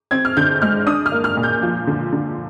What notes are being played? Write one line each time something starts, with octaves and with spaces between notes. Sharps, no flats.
C4 G#6
F6
D3 G6
G#3 F6
D4 D#6
F6
A#3
F6
A#2
G6
F3
D3
D3